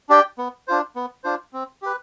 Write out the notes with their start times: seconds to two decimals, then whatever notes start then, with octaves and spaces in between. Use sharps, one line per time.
0.09 D4 G4 D5 G5
0.38 B3
0.68 D4 F4 C5
0.96 B3
1.24 D4 F4 C5
1.53 C4
1.82 G4 B4